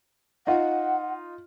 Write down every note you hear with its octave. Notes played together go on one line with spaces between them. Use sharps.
D#4 F4 F#5